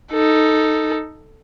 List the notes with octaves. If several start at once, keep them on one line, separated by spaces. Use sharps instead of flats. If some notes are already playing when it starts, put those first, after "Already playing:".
D#4 A4